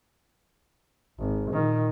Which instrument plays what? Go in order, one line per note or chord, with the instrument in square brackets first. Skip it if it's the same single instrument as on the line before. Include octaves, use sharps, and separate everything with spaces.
[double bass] G#1
A#2 D#3